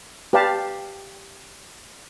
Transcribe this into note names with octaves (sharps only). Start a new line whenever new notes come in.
G4 B4 D5 F5 A5